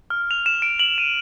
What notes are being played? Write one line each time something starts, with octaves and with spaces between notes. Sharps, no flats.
F6
F7
E7
D7
F#7
D#7